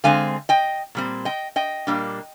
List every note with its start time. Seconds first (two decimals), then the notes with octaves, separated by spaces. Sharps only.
0.04 D3 G#3 C4 F5 G#5
0.49 D#5 G5
0.95 A#2 G3 C4
1.25 D#5 G5
1.56 D#5 G5
1.87 A#2 G3 A#3 D4